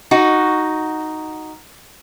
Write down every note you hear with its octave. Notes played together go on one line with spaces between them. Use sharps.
D#4 F#4